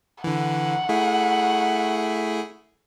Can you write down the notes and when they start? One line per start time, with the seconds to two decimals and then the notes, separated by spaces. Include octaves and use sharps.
0.24 D3 E3 F#5
0.89 A3 E4 G#4